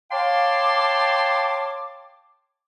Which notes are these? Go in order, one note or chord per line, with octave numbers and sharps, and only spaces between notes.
C#5 F5 G5 A5 C6 D6